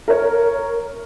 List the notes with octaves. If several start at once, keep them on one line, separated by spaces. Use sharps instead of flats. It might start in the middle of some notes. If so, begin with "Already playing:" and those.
A#4 C#5